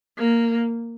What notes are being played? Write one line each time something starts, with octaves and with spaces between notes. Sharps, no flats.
A#3